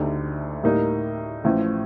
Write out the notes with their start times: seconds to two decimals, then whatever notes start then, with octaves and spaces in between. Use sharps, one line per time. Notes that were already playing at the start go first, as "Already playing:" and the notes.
Already playing: D2 D3 A3 D#4 G4
0.63 A2 G3 A#3 D#4
1.44 A1 A2 F3